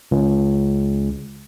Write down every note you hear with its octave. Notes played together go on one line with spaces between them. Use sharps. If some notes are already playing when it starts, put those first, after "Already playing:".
C#2